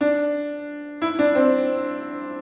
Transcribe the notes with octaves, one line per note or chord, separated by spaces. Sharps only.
D4
E4
D4
C4